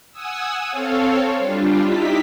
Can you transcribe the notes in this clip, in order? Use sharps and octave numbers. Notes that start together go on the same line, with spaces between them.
F#5 G#5 D#6 E6
C4 A4 C#5 F5
G3 D4 F4
D#4 E4 G4 B6